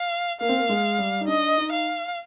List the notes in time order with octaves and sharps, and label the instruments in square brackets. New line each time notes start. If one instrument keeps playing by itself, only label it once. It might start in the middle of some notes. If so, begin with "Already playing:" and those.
Already playing: [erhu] F5
[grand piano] A#3 [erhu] F5
[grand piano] C4
A#3
G#3
G3
D#4
[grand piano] D4 [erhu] D#5
[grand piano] D#4
[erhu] F5